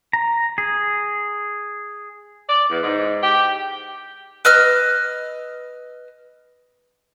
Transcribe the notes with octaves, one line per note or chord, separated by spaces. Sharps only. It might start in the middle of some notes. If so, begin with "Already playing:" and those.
A#5
G#4
D5
E2
G#2
G4
B4 D#5 E6 F6